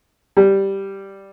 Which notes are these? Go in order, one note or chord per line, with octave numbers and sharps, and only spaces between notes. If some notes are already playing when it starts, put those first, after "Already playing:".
G3